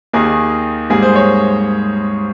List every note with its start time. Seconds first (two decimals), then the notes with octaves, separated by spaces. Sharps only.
0.13 D#2 D#3 A#3 G#4
0.90 G#2 G3 A#3 G#4
1.03 C5
1.16 C#5